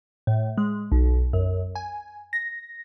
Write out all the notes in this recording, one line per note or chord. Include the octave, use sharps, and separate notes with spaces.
A2
G#3
B1
F#2
G#5
A#6